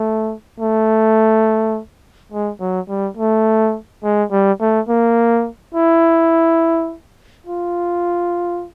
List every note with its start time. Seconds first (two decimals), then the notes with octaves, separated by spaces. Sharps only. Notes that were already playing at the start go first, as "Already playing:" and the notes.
Already playing: A3
0.60 A3
2.32 G#3
2.60 F#3
2.89 G3
3.17 A3
4.04 G#3
4.32 G3
4.60 A3
4.89 A#3
5.75 E4
7.47 F4